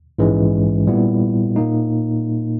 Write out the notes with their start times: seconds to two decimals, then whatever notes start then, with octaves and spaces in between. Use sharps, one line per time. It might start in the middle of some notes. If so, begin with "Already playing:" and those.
0.19 A#1 G#2 E3 G#3 C#4
0.87 A#2 G3 B3 E4
1.56 A#2 A#3 D#4